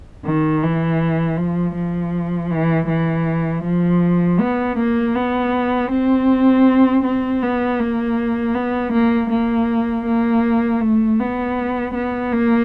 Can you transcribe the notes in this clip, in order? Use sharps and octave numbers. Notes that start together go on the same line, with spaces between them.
D#3
E3
F3
F3
E3
E3
F3
B3
A#3
B3
C4
C4
B3
A#3
B3
A#3
A#3
A#3
A3
B3
B3
A#3